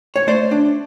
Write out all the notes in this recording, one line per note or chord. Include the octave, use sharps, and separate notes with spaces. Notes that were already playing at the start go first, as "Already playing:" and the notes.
C#5
A3 C5 D5
D4